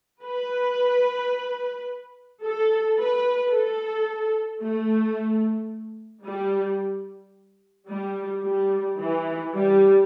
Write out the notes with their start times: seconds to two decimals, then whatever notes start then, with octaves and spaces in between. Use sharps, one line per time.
0.24 B4
2.43 A4
2.98 B4
3.52 A4
4.61 A3
6.25 G3
7.89 G3
8.44 G3
8.98 E3
9.53 G3